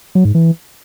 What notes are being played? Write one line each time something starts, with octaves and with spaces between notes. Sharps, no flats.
F#3
G#2
E3